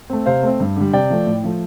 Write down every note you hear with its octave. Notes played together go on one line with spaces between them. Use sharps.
A3 C4
C3 C5 F5
A3 C4
G2
D3 G3
C3 D5 G5
F3 A3
A2
F3 A3